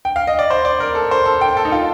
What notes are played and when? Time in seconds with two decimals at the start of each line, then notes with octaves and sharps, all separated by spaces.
0.05 G5
0.16 F5
0.27 D#5
0.39 D5
0.50 C5
0.65 D5
0.80 A#4
0.95 A4
1.11 C5
1.25 A4
1.41 G5
1.57 A4
1.65 D#4
1.72 F4